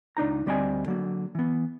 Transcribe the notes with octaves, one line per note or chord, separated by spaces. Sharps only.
C#2 D4 D#4 A#5
D2 G3 C4 D5 D#5 G#5
D3 F#3 A#3
E3 B3